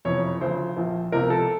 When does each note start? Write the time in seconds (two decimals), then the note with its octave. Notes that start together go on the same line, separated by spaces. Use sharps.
0.05 F#1 F2 C3 E3 C#5
0.41 D2 C#3 F3 C5
0.76 A#1 A#2 F3
1.12 C#2 C3 F3 A#4
1.30 A4